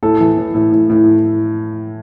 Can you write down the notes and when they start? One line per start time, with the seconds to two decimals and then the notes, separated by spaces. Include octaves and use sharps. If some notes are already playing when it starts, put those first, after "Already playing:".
0.03 A2 A4
0.20 E3
0.38 A2
0.55 A2
0.72 A2
0.90 A2